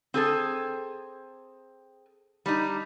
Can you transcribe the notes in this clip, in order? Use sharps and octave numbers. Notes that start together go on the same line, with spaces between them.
C4 G#4 A4
G3 D4 D#4